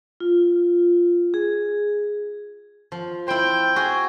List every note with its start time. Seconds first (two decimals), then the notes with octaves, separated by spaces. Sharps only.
0.20 F4
1.34 G#4
2.92 F3
3.28 E4 C5 G5
3.76 F#4 G#4